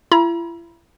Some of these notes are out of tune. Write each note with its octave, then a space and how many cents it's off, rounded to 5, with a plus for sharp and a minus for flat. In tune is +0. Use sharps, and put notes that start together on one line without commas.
E4 +40 A#5 +45